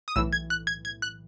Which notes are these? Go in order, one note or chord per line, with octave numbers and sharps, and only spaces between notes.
D#6
B1 A2 E3 E6
G#6
F#6
G#6
G#6
F#6